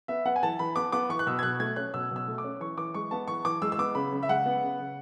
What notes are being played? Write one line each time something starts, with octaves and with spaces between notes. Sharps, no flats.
B3 E5
B3 F#5
G#5
E3 A5
E3 B5
B3 D6
B3 D6
E3 C#6
F#6
B2 E6
G#6
B2 F#6
A3 G#6
C#4 F#6
B2 E6
B2 E6
A3
D6
C#4
E3 C#6
E3 D6
G#3 C#6
B3 A5
E3 C#6
E3 D6
G#3 E6
E6
B3 D6
C#3 B5
C#3
E5
G#3 F#5
B3
C#3
C#3